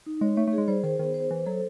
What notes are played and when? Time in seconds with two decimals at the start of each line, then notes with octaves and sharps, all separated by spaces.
0.06 D#4
0.21 G#3 C#5
0.37 A3 C#5
0.47 A3
0.53 G#4
0.58 G#3
0.68 G3 C5
0.84 D#3 C5
0.99 D#3 B3
1.14 C5
1.31 E3 C5
1.46 F#3 A4